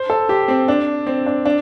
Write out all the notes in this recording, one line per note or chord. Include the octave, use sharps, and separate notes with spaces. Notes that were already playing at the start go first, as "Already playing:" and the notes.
Already playing: C5
A4
G4
C4
D4
C4
D4
D4